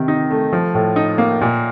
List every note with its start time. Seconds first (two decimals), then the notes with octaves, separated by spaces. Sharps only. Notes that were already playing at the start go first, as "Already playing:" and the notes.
Already playing: C3 D#3
0.08 D#4
0.31 A3
0.53 F3
0.74 A2
0.96 D#4
1.18 A#3
1.41 A#2